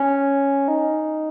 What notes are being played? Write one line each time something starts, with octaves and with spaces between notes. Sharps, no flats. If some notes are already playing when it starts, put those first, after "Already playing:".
Already playing: C#4
D#4